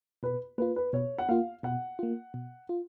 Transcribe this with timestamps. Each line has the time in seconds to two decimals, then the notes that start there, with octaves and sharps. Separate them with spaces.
0.23 B2 B4
0.58 A#3 F4 B4
0.76 B4
0.93 B2 C#5
1.18 F#5
1.29 A#3 F4 F5
1.63 B2 F#5
1.99 A#3 F4
2.34 B2
2.69 F4